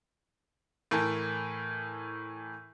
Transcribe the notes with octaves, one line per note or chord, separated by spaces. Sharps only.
A2 E3 A#4 A5